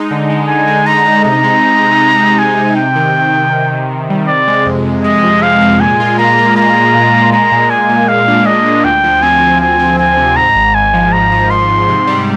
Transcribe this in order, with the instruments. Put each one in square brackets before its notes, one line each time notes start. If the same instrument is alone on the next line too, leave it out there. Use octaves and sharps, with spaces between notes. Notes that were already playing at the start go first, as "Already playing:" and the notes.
Already playing: [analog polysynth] G#3 D#4
D3
G#3
[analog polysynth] D3 [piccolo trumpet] G#5
[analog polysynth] G#3
[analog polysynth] D#4 [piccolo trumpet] A#5
[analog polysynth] D#4
[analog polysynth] C3 [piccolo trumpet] A#5
[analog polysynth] G#3
C3
C3
C3
G#3
[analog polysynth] G#3 [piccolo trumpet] G#5
[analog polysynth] C3
[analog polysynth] C3 [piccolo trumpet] G5
[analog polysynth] D#3
C3
C3
C3
C3
C3
G3
[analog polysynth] C3 [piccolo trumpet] D5
[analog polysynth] G#3
F2
F2
[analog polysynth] G#3 [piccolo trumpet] D#5
[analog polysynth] F3
[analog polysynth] C3 [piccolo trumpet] F5
[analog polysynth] G#3
[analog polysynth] A#2 [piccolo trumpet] G#5
[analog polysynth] F4
[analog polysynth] A#3 [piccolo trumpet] A#5
[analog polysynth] F4
[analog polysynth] F4 [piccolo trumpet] A#5
[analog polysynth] A#3
A#2
A#3
[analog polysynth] G#3 [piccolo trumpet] A#5
[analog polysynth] A#2
[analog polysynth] G#3 [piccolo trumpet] G#5
[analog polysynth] A#2
[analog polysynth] A#2 [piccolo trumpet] F5
[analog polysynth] D4
[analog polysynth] A#2 [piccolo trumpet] D#5
[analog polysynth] A#2
[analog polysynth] D2 [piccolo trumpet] G5
[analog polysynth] F3
[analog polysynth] C4 [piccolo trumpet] G#5
[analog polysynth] D2
[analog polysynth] D2 [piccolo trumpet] G#5
[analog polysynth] C4
[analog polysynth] C4 [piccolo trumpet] G#5
[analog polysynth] C3
[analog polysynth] G#2 [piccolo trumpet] A#5
[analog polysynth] G#1
[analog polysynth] G#2 [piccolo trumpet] G#5
[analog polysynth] F3
[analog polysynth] G#1 [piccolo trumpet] A#5
[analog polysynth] F3
[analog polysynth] F3 [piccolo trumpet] C6
[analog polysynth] G#2
C3
G3